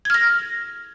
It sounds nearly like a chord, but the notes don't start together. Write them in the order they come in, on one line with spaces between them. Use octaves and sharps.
G#6 F6 A#6